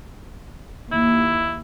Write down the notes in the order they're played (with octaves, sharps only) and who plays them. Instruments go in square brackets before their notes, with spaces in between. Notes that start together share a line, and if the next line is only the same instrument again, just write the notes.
[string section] D#2 [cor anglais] E4